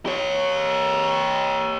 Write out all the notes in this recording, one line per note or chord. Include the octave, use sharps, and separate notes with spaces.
G4 C#5